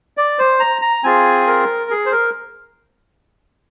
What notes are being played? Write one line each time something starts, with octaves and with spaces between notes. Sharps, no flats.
D5
C5
A#5
A#5
C4 F4 G#4 G#5
A#4
G#4
C5
A#4